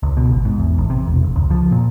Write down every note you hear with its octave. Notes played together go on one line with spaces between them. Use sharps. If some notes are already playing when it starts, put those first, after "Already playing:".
C#2
B2
G#1
G#2
E2
A1
C3
E1
F1
C#2
F3
A#2